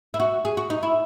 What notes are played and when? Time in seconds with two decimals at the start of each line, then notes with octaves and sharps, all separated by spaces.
0.14 E4
0.20 F#4
0.45 G#4
0.57 F#4
0.70 D#4
0.83 E4